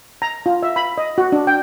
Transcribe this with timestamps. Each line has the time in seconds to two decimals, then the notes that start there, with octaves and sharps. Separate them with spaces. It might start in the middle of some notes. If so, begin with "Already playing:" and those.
0.22 A#5
0.46 F4
0.63 E5
0.76 B5
0.98 D#5
1.18 F#4
1.32 D4
1.47 G5